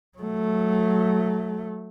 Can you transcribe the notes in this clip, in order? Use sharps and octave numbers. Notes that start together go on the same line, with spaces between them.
F#3 A3